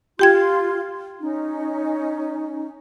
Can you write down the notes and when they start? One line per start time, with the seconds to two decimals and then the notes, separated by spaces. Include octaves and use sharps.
0.19 F4 G4 G5 C6 G#6
1.21 C#4 D#4